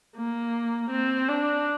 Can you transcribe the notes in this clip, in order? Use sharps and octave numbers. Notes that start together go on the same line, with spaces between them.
A#3
C4
D4